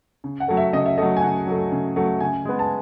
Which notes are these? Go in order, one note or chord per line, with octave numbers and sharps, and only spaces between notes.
C#3
F#5
F#3 A3
E5
C#3 D#5
E5
F#3 A3 D#5
G#5
C#3 F#5
F#3 A3
C#3
F#3 A3
C#3 G#5
G#3 B3
A5